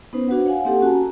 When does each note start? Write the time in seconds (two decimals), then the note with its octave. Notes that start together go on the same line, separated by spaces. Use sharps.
0.13 B3 C#4 D#4 B4 C5
0.28 D4 F#4 B4 F#5
0.46 C#5 F5 F#5 G#5
0.65 A#3 C4 D#4 G4 A4 F#5
0.81 C#4 F#4 G#5 A5
0.93 A#5